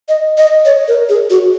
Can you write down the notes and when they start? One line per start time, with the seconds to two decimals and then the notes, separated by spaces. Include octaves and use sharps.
0.09 D#5
0.38 D#5
0.65 C#5
0.88 A#4
1.09 G#4
1.30 F#4